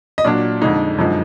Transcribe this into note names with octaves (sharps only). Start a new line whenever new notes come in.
D#5
A#2 F#3 D4 D5
F2 D3 G#3 D#4
F#2 D3 F3 G#3 D#4